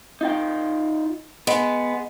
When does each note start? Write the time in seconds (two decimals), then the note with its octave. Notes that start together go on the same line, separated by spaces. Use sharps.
0.21 D#4 F4 G5
1.47 G#3 B3